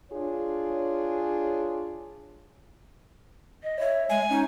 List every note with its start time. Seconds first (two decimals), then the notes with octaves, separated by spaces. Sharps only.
0.12 D4 F4 G#4 C#5
3.63 D#5
3.79 C#5 E5
4.09 G#3 G#5
4.29 C#4 D#4